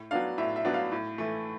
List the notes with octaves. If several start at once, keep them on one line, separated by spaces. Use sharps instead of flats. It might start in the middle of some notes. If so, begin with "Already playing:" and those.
Already playing: A2
F#3 B3 D4 F5
A2 E5
E5
F#3 B3 D4
F5
A2
E3 A3